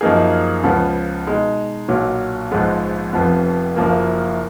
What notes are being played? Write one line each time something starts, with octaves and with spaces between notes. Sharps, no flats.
F#2 F3 A#3 D#4 G#4
C#2 C#3 F3 B3
B2 G#3 D#4
B1 A#2 F#3
A#1 G#2 F3 G#3 B3
F1 F2 F3 B3
F#1 F#2 F3 A#3